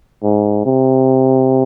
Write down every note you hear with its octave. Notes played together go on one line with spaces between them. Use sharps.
G#2
C3